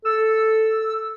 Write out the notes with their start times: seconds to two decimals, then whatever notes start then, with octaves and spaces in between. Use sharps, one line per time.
0.05 A4 E6